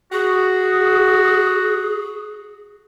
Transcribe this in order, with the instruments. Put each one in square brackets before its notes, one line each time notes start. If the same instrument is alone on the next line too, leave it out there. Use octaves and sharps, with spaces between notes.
[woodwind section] F#4 [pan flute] G#4